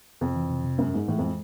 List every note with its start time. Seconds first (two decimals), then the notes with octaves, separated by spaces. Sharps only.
0.21 F2 C3
0.35 E3
0.50 C3
0.64 C3
0.78 F#2 G#3
0.94 G#2 G#3
1.08 A2 E3
1.18 F2 G#3